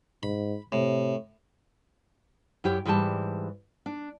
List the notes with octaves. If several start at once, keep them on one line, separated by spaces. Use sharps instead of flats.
G#2 B5
A2 C3
F#2 E4 G4 C#5
G#2 E3 G3 G4 A5
D4